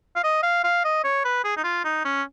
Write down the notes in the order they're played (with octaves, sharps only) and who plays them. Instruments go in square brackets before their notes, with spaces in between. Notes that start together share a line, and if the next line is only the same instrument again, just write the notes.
[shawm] F5
D#5
F5
F5
D#5
C#5
B4
G#4
D#4
F4
D#4
C#4